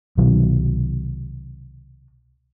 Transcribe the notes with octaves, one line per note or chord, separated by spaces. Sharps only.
C2 B2 D#3 F#3